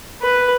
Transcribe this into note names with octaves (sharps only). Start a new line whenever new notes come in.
B4